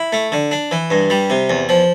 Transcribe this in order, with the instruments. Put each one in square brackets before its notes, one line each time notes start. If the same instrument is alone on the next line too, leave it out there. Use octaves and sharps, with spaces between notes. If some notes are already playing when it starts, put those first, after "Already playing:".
Already playing: [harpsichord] E4
A3
D3
D4
E3
G2
G3
C3
E2
F3